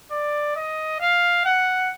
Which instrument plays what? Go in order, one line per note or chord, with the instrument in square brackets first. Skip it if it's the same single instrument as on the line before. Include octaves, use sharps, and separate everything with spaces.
[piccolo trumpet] D5
D#5
F5
F#5